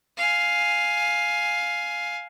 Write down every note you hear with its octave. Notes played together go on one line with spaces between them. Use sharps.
F5 G#5